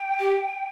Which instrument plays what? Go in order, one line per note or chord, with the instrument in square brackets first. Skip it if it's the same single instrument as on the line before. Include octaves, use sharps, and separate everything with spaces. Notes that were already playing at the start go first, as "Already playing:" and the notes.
Already playing: [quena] G5
[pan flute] G4